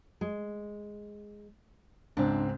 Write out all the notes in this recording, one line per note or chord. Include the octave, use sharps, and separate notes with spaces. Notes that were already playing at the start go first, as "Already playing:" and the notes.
G#3
C#2 G#2 C4 D4